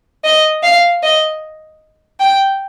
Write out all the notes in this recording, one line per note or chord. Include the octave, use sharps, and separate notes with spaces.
D#5
F5
D#5
G5